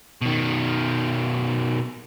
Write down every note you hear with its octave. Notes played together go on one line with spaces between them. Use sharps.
B2 D#3